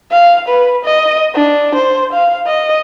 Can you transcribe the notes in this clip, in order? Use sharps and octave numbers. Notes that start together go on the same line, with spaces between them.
F5
B4
D#5
D4
C5
F5
D#5